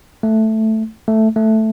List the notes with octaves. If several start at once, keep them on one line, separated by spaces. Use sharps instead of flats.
A3
A3
A3